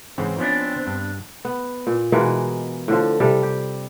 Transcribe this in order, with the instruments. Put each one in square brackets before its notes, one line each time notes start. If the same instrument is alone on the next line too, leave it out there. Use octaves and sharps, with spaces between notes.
[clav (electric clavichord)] G#2 C#3 E3 [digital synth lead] C4
[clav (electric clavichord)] F3 C#4 E4 [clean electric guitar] B3 D4
[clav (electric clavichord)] G2
[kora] B3
A#2
B2 E3 G#3 A#3
A2 D3 F3
C3 G3 A4
G4